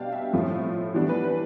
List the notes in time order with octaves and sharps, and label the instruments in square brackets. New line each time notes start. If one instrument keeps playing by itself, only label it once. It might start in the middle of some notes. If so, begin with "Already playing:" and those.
Already playing: [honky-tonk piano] B2 G3 B3 D4 F5 G5
E5
A2 F3 A3
E3 G3 B3 D4
B4
B4